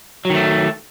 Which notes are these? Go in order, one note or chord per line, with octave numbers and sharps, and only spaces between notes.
D#3 F#3 A3